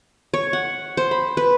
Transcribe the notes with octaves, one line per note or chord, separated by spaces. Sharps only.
C#5
F#5
C5
B5
B4